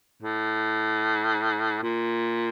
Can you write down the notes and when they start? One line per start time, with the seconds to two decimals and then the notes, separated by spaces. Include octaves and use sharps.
0.23 A2
1.83 A#2